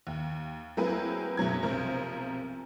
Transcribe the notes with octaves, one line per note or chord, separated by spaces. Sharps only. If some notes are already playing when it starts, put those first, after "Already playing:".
D#2
F#3 A#3 C4 E4 G#4 B4
F#1 B2 F#3 G#6
B1 C3 F3 A#4 C5 A#5